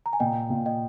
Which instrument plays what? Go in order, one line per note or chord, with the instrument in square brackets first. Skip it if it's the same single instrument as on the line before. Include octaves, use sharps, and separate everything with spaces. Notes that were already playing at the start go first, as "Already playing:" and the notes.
[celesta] A#5
G#5
[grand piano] A#2 [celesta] D#5 G5
[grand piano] A#2
[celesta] D#5 G5